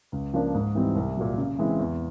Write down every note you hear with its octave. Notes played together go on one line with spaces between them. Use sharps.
C#2
C#3 F3 A#3 D4
G#2
E3 G3 C4 D#4
C2
A#2 F#3
C#3
E3 G#3 C4 E4
E2